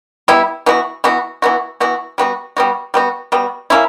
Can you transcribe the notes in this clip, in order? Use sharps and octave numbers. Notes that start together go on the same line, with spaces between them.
G3 B3 E4
E3 B3 F#4
E3 B3 F#4
E3 B3 F#4
E3 B3 F#4
G3 B3 F#4
G3 B3 F#4
G3 B3 F#4
G3 B3 F#4
A#3 C#4 E4